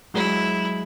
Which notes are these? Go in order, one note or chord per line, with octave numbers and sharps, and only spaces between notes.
F#3 G#3 E4